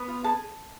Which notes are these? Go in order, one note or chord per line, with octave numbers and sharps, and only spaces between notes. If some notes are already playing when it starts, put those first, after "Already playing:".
Already playing: B3
F4
G#4 A5